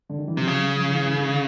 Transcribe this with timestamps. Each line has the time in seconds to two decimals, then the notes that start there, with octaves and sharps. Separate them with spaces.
0.09 D3
0.19 D#3
0.28 E3
0.37 C3 F3
0.47 C#3 F#3
0.62 F#3
0.76 F3
0.91 E3
1.06 E3
1.17 D#3
1.28 D3